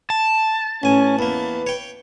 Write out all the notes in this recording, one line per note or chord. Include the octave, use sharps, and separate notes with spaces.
A5
A1 C#4 G#5
E2 A#3 B4
C#5 G5